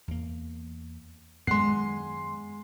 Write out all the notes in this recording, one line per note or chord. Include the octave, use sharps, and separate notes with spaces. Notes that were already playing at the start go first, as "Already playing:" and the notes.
E2 A#3
F#2 D#3 G#3 B3 F#5 C6 C7